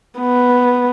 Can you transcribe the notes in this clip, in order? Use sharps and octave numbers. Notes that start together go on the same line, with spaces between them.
B3